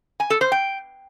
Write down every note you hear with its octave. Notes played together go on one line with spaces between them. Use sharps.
G#5
A4
C5
G5